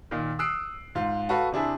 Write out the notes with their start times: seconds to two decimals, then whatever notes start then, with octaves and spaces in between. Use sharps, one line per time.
0.11 A#2 D#3
0.39 D#6 E6 F#6 C7 D7
0.95 G#2 F4
1.29 F#4 A4 B4 F5
1.52 C3 D4 E4 G#4